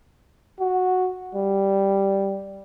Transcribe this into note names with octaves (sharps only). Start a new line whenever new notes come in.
F#4
G3